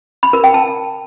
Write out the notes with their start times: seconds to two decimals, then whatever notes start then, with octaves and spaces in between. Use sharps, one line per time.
0.23 B5
0.33 A#4
0.44 G5
0.54 A5